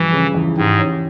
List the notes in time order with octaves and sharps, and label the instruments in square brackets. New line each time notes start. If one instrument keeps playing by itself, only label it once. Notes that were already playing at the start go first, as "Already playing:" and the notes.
Already playing: [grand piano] G2 F3 [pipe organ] E3
[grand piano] C#3
E2
[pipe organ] G#2 [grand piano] G4
[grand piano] C#4